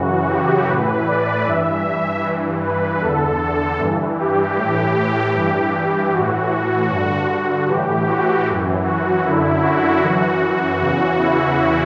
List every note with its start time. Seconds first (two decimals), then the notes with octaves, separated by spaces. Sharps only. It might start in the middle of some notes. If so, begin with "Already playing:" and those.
Already playing: F#2 C#3 E3 F#4
0.30 G4
0.67 A2 E3 B4
1.07 D5
1.45 G2 E3 E5
1.85 E5
2.23 G2 E3
2.62 B4
3.01 E2 D3 A4
3.79 G2 E3
4.19 G4
4.57 A2 E3
5.35 G2 E3
6.13 A2 E3 F#4
6.90 G2 D3
7.68 A2 E3 G4
8.07 F#4
8.47 F#2 E3
8.85 F#4
9.25 F#2 D3 E4
9.62 F#4
10.02 F#2 E3 F#4
10.41 F#4
10.80 E2 C#3 E3 F#4
11.19 E4